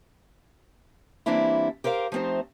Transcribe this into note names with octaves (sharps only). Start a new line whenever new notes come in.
E3 G3 A#3 C4 D4 E4
G4 A#4 C5 D5 F5
F3 A3 C4 D#4 C5